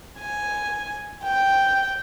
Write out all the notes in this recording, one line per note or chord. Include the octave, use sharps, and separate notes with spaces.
G#5
G5